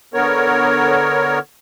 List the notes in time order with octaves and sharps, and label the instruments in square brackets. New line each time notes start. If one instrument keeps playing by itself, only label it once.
[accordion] D3 B3 A#4 C#5